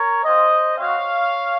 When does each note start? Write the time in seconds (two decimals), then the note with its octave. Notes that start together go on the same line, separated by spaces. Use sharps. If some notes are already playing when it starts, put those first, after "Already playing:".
Already playing: A#4 C#5
0.25 C4 F4 C5 D#5
0.78 C4 F#4 C#5 F5